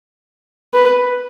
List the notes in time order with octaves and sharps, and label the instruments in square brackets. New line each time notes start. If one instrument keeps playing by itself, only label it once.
[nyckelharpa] B4